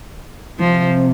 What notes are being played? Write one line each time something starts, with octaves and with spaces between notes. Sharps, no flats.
C3 F3